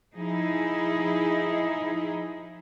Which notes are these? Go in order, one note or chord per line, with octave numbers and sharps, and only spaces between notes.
F3 D#4 E4 G#4